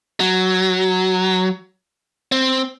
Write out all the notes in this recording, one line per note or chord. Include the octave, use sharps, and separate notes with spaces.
F#3
C4